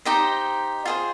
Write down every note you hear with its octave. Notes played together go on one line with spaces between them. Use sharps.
D#4 G4 C5 D#5
F4 G#4 C5